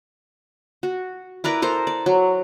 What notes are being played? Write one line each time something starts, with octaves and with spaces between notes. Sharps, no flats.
F#4
E4 A#4 B4 D5
A4 A#4 C5
D5
F#3